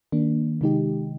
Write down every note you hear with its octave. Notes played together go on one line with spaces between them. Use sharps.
D#3 A#3 D4
C3 D#3 G#3 D#4 G4